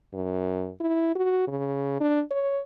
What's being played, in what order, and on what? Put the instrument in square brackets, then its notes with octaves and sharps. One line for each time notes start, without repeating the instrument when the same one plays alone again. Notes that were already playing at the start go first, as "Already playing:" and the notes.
[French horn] F#2
E4
F#4
C#3
D4
C#5